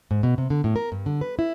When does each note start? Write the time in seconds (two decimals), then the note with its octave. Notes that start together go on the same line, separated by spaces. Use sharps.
0.11 G#2
0.23 B2
0.38 C3
0.50 D3
0.64 A2
0.76 A#4
0.92 G2
1.06 D3
1.21 B4
1.39 E4